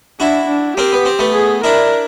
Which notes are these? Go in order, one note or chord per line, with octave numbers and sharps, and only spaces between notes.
D4 E4 F#4
D4
A#3 C4 G4
B3
C4
A3 B3
G#4
D4 E4 A#4